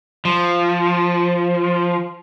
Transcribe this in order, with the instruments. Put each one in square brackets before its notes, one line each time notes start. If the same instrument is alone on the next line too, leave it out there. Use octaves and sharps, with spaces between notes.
[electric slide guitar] F3